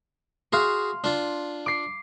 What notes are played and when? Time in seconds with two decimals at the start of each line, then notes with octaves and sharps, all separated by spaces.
0.53 F#4 G#4 F5 C6
1.04 D4 F4
1.66 D6 C7